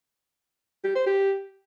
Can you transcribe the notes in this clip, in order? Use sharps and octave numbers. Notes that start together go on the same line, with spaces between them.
G4
C5
G4